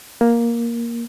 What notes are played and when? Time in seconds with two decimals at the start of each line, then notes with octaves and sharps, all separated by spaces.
0.21 A#3